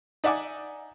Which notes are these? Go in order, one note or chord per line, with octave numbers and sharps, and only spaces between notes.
D#4 D5 E5 F#5 G#5 D6